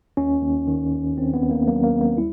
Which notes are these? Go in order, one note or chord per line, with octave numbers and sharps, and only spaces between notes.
D#2 C#4
D#2
D#3
D#2
D#3 C4
B3
D#2
A#3
F#3 A#3
A#3
D#2
A#3
G3 E4